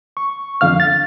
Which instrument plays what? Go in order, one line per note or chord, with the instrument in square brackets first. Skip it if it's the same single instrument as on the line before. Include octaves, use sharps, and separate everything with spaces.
[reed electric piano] C#6
F2 D3 F5 F6
A6